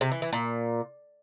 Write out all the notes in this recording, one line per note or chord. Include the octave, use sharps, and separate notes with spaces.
C3
E3
E3
A#2